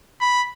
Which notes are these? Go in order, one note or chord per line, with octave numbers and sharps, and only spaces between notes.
B5